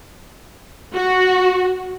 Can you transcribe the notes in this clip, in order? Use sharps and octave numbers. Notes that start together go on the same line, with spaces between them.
F#4